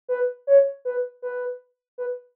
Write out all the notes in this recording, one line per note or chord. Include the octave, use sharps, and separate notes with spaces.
B4
C#5
B4
B4
B4